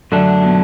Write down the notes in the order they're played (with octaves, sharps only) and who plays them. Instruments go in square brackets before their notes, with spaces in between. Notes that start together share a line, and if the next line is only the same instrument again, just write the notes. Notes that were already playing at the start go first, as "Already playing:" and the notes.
[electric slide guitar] F#2 F#3 A3 D4 [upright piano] D3
[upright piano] B2